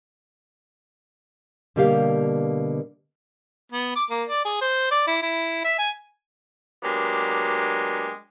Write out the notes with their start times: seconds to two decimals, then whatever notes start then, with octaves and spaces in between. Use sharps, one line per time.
1.76 B2 D3 G3 A#3 G4 F5
3.72 B3
3.96 D6
4.10 A#3
4.29 D5
4.45 G#4
4.61 C5
4.91 D5
5.07 E4
5.22 E4
5.64 E5
5.79 G#5
6.82 F#3 G#3 A#3 B3 D4 G4